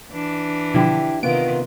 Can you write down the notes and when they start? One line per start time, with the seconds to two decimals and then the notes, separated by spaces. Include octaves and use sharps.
0.12 E3 D4
0.74 B2 D3 F3 E4 G4
1.23 C3 D#3 B3 F4 D7